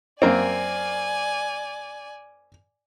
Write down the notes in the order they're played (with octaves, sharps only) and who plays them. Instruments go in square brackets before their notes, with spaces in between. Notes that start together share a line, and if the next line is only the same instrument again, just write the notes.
[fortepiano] F#2 A#3 C4 [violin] D5 G#5